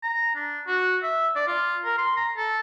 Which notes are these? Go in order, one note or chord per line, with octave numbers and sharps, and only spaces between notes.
A#5
D4
F#4
E5
D5
F4
A#4
C6
A#5
A4